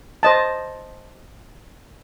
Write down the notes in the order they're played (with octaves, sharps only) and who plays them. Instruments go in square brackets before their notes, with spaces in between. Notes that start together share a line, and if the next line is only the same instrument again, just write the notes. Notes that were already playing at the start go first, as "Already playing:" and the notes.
[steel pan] C5 D#5 A5